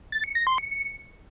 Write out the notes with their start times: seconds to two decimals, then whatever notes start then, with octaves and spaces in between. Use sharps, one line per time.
0.12 A6
0.24 C#7
0.35 A#6
0.47 C6
0.58 C#7